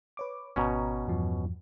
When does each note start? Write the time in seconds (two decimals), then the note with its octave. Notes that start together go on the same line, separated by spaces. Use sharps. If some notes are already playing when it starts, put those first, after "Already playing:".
0.17 B4 C#5 D6
0.56 G#1 B2 C#4 A#5
1.07 E2 G2 F3